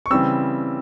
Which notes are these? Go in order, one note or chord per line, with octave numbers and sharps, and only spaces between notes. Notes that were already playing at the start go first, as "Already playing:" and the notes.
C#6
C#3 E3 G3 C4 E6